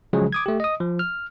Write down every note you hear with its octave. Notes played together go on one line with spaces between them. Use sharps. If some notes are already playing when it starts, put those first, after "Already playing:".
C#3 F3 F#3 G#3 G#4
D6 D#6 G#6
A3 G4
D#5 D#6
F3
F6